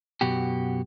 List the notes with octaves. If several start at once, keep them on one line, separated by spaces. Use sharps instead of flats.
F#2 B2 F#4 G4